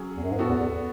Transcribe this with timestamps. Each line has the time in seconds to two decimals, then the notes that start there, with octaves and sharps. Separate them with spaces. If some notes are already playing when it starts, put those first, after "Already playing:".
Already playing: F#3 C#4 G#4
0.17 E2
0.23 F#2
0.31 G#2
0.38 A2 B3 F#4 A4
0.49 E2
0.60 E2